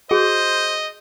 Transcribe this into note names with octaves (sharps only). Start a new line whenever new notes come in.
F#4 G#4 C5 D#5